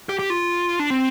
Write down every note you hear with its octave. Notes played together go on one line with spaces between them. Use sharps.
G4
G4
F4
D4
C4